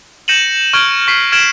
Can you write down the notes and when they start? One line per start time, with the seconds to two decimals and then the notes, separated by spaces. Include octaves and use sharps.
0.28 G6 A#6 C#7 D#7 E7 F#7
0.73 C#6 F6 G6 G#6 D7
1.08 C#6 B6 C7
1.32 F6 G#6 D7 E7 F#7